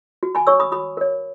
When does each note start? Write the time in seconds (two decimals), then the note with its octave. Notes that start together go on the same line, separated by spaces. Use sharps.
0.23 F#4
0.35 G#5 B5
0.47 C#5 C#6 E6
0.60 B5 D#6
0.72 F#4 B5 D#6
0.97 A#4 C#5